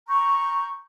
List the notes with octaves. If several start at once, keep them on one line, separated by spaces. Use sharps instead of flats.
A#5 C#6 G6